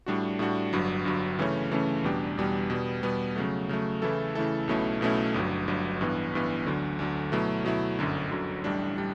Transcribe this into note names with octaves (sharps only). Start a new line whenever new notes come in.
A2 G3 D4 F#4
A2 G3 D4 F#4
G1 G2 F#3
G1 G2 F#3
C#3 E3 A3 C#4
C#3 E3 A3 C#4
E2 B2 G3 D4 G4
E2 B2 G3 D4 G4
B2 G3 B3
B2 G3 B3
C#3 F#3 A3
C#3 F#3 A3
C#3 E3 A3 E4 A4
C#3 E3 A3 E4 A4
B1 B2 A3 C#4 E4
B1 B2 A3 C#4 E4
G1 G2 F#3
G1 G2 F#3
A1 G2 E3 B3
A1 G2 E3 B3
D2 D3 F#3
D2 D3 F#3
B2 F#3 A3 E4
B2 F#3 A3 E4
G1 F#2 D3 F#3
G1 F#2 D3 F#3
A1 A2 G3 D4
G3 D4